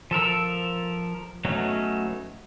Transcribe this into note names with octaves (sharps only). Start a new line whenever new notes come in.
F3 A4 A#4 E6
F#3 A3 B3 C#4 D#4